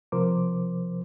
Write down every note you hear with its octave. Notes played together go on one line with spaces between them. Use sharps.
C3 F3 A#4 C5 D6